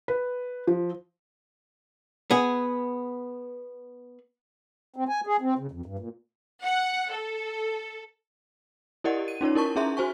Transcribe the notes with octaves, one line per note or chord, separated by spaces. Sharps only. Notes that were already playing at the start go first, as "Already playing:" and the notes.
B4
F3
B3 G#4
C4
G#5
G#4
C4
C#3
F2
G2
A#2
F#5
A4
E4 G4 A#4 D5 D#5 F#5
D#7
C#4 D#4 F4 C#5
E4 A#4 A5 C#6
C#4 D#4 G#4 E5 A#5 C6
F#4 C5 G#5 C#6